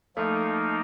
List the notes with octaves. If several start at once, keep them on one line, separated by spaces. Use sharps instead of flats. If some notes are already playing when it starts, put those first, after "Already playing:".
F3 A3 A#3 D#4